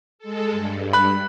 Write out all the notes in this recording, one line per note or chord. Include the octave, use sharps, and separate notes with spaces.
G#3 A4
G2
B5 F#6